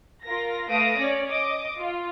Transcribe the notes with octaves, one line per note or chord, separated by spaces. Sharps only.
F4 A#4 A#6
A3 B4 F5 D#6 A#6 D7
C#4 C#5 D5
D#5 D6 D#6
F4